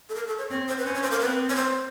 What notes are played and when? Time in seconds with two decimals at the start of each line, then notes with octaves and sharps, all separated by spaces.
0.09 A4
0.15 A#4
0.27 A4
0.38 C#5
0.50 C4 C#5
0.68 C5
0.78 B4
0.85 C#4 C5
0.94 C#5
1.03 C5
1.11 A#4
1.20 C4 B4
1.50 C#5
1.56 C5